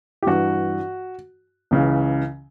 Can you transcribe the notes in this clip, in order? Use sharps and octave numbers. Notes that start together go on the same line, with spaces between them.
G4
G2 E3 F#4
C#2 C#3 E3